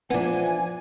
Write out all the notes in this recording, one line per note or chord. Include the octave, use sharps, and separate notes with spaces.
E3 F3 B3 D4 G#5